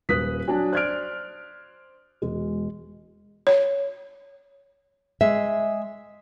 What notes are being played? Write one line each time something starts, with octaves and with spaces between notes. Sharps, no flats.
D#1 B4 D#6 F#6 B6
F#3 D4 G#5
C5 D5 F6 F#6 G#6 D7
E1 G#3
C#5
G#3 E5